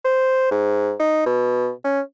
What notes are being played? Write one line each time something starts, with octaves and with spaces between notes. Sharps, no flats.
C5
G#2
D#4
B2
C#4